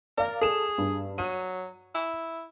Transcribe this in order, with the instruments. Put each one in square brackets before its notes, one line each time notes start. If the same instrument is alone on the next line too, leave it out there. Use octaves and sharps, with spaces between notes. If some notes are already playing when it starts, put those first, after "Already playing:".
[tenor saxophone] A#4 [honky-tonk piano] D5 F5
[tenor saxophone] G#4 [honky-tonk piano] A4 E7
[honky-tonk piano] G2
[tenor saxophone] F#3 [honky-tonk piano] D#7
[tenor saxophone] E4